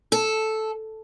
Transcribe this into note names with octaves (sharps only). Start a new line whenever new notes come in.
A4